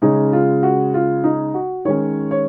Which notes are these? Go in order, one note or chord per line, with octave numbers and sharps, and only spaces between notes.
C#3 G#3 C#4 D#4
F4
F#4
F4
D#4
F#4
D#3 G#3 C#4 C#5
C#5